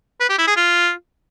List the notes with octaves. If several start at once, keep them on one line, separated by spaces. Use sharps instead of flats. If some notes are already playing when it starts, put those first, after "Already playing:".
B4
G4
E4
G#4
F4